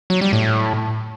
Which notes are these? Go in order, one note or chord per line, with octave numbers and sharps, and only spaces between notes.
F#3
G3
A2